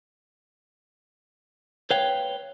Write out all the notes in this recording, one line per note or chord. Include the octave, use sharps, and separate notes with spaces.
B4 C#5 F5 G5